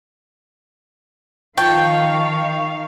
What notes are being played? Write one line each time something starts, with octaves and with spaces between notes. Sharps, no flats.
D#3 F3 F5 G5 A5 C#6